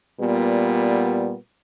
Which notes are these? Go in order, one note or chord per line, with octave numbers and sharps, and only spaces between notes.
A#2 G3 B3